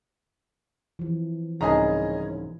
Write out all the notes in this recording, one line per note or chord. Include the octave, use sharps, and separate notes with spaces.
E3 F3
C2 G#2 C#3 G#4 C#5 D#5 A#5